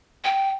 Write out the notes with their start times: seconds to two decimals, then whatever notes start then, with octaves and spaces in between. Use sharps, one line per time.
0.24 G5